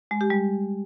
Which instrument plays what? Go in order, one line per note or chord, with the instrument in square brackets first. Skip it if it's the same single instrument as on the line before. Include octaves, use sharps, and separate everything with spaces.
[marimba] G#3
G4
G3